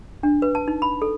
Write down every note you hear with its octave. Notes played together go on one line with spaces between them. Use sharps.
D4
B4
A5
D#4
B5
A4